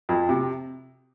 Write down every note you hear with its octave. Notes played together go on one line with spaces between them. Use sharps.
F2
C3